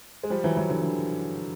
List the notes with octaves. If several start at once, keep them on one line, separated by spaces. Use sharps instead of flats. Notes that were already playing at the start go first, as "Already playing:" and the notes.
G#3
F3 G3
E3 F#3
E3 F#3
D3 E3
D3 E3